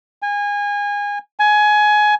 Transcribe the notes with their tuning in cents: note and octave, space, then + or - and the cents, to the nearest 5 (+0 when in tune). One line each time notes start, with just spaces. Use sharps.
G#5 -25
G#5 +20